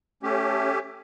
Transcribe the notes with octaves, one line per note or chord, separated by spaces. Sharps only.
A3 C#4 G4